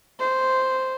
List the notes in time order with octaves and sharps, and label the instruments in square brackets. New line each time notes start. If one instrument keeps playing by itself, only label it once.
[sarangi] C5